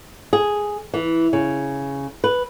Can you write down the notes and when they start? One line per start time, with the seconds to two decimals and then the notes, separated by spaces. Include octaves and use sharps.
0.33 G#4
0.94 E3
1.33 C#3
2.24 B4